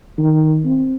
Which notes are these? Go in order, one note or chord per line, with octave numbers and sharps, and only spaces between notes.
D#3
C4